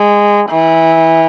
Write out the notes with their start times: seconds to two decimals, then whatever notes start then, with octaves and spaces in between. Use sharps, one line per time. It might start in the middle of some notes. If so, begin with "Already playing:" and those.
Already playing: G#3
0.51 E3